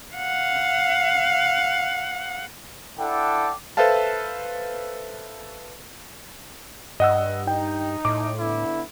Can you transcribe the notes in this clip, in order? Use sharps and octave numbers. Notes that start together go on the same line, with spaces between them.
F5 F#5
D4 E4 A4 F#5 G5 D6
A4 B4 C5 E5 F5 A5
G2 D#5 F#5 E6
D#4 G5
A2 D6
D3 B3 E4